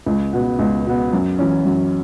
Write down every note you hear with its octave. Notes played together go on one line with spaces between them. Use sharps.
C#2
B2 B3
C#2
B2 B3
F#2
E3 C#4
F#2